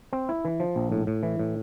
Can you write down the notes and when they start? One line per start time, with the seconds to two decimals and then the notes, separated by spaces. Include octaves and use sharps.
0.13 C4
0.29 E4
0.45 E3
0.60 F3
0.76 A#1
0.92 A2
1.07 A2
1.23 E3
1.39 A2